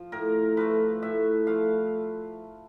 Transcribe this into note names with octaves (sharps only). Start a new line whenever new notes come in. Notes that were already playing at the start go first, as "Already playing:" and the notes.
Already playing: F3
A2 A#4
F3 A3 B4
A2 E5
F3 A3 F5